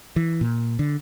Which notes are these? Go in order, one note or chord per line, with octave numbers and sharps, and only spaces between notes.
E3
A#2
D3